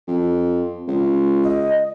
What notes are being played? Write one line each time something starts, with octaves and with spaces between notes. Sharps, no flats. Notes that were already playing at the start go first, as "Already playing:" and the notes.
F2
C#2
D#5